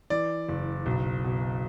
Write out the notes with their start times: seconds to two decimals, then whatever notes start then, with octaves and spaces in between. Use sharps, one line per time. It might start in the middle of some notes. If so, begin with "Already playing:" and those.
0.10 E3 D5
0.48 F#1
0.86 B1
1.24 B2